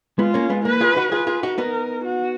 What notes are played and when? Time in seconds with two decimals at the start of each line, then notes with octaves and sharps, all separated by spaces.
0.19 G#3 B3 F4
0.34 A#3 C#4
0.50 G#3 B3
0.65 A#3 B4
0.81 F4 G#4
0.96 D#4 F#4
1.12 F4 G#4 B4
1.27 F4 G#4
1.43 D#4 F#4
1.58 B3 D#4 A#4
2.04 F#4